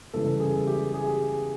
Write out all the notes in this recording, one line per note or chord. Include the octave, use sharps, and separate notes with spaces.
C#3 E3 G3 A4
G#4
G4
G#4